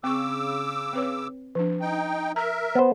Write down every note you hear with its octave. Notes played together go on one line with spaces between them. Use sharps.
C#3 C4 C#6 D6 E6
C4 B4 C#5
F3 D4
D#4 G5
A#4 E5 A#5
B3 C5